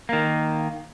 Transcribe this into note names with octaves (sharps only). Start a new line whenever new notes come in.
D#3 A#3